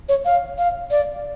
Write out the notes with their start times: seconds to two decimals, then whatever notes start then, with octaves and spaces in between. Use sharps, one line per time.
0.09 C#5
0.25 F5
0.58 F5
0.91 D5